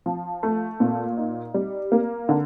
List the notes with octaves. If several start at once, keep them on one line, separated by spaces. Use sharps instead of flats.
F3
A3
A#2
D#4
G3
A#3
D3